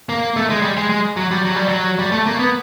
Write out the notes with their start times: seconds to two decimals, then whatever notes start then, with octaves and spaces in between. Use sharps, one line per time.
0.09 A#3
0.36 A3
0.50 G#3
0.62 G3
0.77 G#3
0.89 G#3
1.16 F#3
1.31 G3
1.45 F#3
1.56 G3
1.69 F#3
1.99 G3
2.12 A3
2.26 A#3
2.39 B3